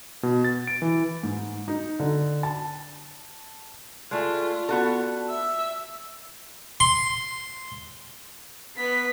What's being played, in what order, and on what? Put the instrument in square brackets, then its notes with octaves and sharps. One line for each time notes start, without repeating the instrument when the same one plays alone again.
[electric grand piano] B2
A6
D7
E3
[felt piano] G#2
D#4
D3
A5
[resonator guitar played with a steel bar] G#3 A3 [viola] F4 [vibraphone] D5 A5
[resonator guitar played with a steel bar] B3 F#4 A4
[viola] E5
[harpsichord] C6
[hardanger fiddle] B3 B4 [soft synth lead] B6